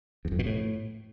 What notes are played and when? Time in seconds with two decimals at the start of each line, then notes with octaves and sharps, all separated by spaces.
0.25 E2
0.32 F2
0.39 B2
0.46 A2